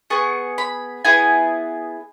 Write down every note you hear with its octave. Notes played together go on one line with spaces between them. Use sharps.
B3 G#4 C#6
B5
B3 E4 G#4 G#5